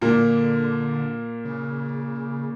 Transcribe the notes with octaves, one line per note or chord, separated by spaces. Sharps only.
A#2 D3 A#3
C#3